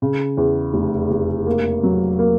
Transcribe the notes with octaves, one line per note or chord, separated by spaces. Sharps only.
C#3
E2
F1
F1
A#3
F#3
A#3